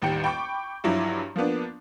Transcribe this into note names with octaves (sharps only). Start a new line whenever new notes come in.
A1 D#2 G3 G5 C#7
G5 B5 C#6 D6 G6
G2 F3 F#3 E4 D6
F3 A#3 B3 D4